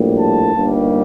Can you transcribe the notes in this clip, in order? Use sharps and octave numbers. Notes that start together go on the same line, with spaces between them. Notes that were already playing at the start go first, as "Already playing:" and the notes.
Already playing: A#1 A2 G3 A#3
A5
G1 G2 D#3 G3 A#3